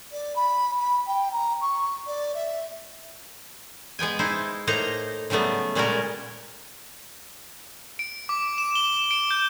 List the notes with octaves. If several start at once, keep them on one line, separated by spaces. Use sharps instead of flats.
D5
B5
B5
G5
A#5
C#6
D5
E5
G#3 B3 G5 G#5
D#4 E4 C5
A2 A#3 D#4 C5 A#5
C#3 F#3 G3 A3 B3
A#2 G3 G#3 C#4 F#4 A#4
D7
D6
E7
G7
D7
G6